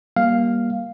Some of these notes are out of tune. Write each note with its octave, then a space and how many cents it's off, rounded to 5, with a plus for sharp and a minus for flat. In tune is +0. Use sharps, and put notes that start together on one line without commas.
G3 +0 A#3 +25 F5 +0